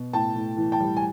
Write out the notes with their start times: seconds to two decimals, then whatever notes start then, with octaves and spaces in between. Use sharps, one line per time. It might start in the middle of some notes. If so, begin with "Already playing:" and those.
Already playing: B2
0.13 A2 G5 A5
0.35 A2
0.57 E3
0.72 G5 A5
0.80 G3
0.97 G#5